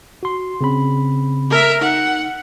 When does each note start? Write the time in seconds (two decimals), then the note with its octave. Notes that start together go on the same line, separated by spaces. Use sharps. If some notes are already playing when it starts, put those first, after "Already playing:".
0.23 F#4 C6
0.61 C#3 C4 B5
1.50 A#4 E5
1.81 D#4 F#5